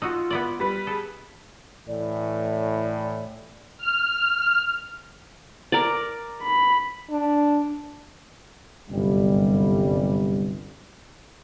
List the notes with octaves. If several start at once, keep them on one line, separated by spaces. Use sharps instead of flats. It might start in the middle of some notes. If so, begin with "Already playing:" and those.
D#4 F4 F#4 E6
B3 E4 D5
G3 B4
G#4 A4
A2 E3 D5
F6
A#4 D5
B5
D4
G1 C2 F#2 G3